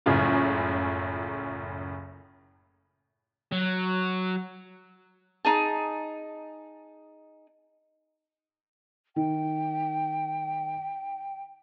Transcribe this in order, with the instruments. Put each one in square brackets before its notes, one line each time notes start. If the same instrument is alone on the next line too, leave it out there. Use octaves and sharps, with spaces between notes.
[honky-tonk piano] F#1 C#2 F#2 A2 C#3 F4
[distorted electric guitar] F#3
[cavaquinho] D#4 G#4 A5
[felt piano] D#3 [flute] G5